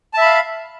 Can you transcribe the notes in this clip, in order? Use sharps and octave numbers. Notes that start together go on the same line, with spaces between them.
E5 F5 A5 B5